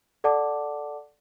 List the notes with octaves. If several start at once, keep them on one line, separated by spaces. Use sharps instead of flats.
A4 D5 F#5 A5 D6